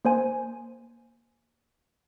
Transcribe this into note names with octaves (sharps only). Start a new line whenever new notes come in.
A#3 C5 G#5